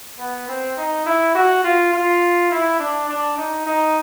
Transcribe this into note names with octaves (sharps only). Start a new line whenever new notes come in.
B3
C4
D#4
E4
F#4
F4
F4
E4
D4
D4
D#4
D#4